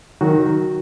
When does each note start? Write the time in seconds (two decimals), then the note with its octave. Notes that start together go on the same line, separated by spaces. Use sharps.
0.21 D#3 F#3 F#4